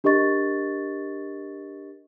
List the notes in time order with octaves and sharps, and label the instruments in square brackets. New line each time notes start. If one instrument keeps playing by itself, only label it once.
[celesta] D4 G4 A#4 D#5 C#6 A6